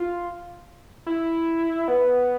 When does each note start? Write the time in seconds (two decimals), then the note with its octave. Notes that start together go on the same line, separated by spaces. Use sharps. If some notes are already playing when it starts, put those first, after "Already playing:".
Already playing: F4
1.06 E4
1.88 B3